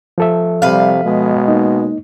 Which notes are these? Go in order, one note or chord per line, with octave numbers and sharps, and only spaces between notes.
F3 A4 E5
C3 G3 B4 F5
B2 G#3
A#3 D#4